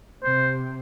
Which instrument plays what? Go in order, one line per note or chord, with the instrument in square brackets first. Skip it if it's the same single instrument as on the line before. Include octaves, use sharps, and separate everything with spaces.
[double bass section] C3 [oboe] C5